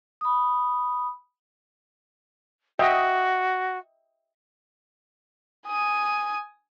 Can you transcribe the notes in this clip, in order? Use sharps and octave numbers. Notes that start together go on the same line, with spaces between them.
B5 D#6
F#4 D#5 E5 G5
G#5 D#6